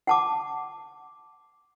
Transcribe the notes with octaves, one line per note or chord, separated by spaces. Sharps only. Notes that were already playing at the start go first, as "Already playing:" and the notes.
F#5 A5 D6